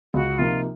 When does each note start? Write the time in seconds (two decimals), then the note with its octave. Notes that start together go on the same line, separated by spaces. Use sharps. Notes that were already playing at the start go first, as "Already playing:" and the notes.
0.14 C#2 F#4
0.39 C3 F3 A#3 D#4 F4